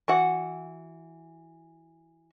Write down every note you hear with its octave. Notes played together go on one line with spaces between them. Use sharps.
E3 F#4 F#5